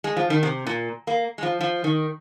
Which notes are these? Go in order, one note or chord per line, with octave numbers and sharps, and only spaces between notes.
G#3
F3
D#3
C3
A#2
A#3
G#3
F3
F3
D#3